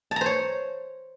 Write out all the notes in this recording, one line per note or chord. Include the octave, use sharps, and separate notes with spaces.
C5 C#5 A5 A#5